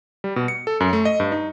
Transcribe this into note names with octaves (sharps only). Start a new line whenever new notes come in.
G3
B2
C#7
A4
F#2
A3
D#5
G2
D#4